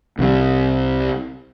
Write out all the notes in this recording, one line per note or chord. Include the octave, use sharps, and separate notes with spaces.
C2 C3 E3 G3